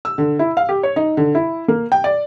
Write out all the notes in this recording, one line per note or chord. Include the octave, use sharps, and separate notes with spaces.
E6
D3
E4
F5
G4
C#5
D#4
D3
E4
A#3
G5
D5